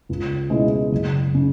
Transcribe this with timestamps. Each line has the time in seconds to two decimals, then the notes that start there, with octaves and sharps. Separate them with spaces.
0.09 C#2
0.50 B2 G#3 C#4 E4
0.91 F#1
1.35 C#3